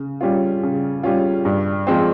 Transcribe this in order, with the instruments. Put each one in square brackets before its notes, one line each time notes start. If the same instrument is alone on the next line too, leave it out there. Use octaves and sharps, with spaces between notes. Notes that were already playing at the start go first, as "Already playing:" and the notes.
Already playing: [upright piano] C#3
G3 C#4 F4
C#3
G3 C#4 F4
G2
F3 G#3 C4